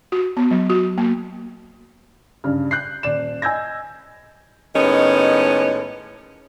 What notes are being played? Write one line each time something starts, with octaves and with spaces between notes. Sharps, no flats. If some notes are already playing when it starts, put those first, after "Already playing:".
F#4
B3
F#3
F#4
A#3
G2 C#3 F6
F#6 G6 C7
D#1 D5 E7
D#5 G#5 E6 G6 G#6 A#6
A2 D#3 G#3 B3 C#4